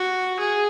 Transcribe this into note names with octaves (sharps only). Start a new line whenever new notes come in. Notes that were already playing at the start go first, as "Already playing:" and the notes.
Already playing: F#4
G#4